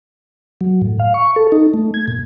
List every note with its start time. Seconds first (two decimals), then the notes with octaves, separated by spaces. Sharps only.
0.61 F#3
0.82 A2
0.99 F5
1.14 C#6
1.36 A4
1.52 D#4
1.74 A3
1.94 G#6
2.08 A#2